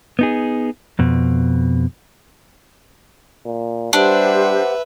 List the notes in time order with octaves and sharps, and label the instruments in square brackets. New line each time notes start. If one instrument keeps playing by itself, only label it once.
[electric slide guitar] B3 D#4 G#4
F2 B2
[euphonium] A#2
[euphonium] G3 [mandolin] D4 [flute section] G4 C5 F#5 [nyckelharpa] B4 E5